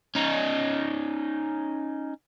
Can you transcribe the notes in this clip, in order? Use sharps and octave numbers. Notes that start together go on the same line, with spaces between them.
C#4 D#4